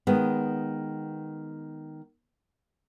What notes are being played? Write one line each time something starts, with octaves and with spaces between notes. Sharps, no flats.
D#3 G#3 B3